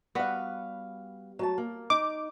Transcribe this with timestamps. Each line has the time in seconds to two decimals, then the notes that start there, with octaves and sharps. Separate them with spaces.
0.15 G3 B3 F#4 B4 F5
1.39 F#3 A3 A5
1.58 A#3
1.90 D#4 D6